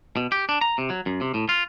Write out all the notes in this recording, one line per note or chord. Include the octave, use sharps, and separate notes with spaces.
B2
G4
D4
A#5
C3
F#3
F#2
C3
A2
F4